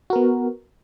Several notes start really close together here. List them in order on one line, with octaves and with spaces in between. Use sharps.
F#4 A#4 B3